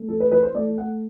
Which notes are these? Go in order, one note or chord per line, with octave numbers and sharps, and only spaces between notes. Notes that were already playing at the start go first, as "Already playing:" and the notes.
Already playing: A3
E3 A4
B4
E3 B4
C5
A3 D5
A3 F#5